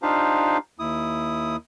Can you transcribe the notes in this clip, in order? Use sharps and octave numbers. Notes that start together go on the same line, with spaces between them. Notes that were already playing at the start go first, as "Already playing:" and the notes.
D4 D#4 F4 G4 C5 F5
D#2 E4 D#6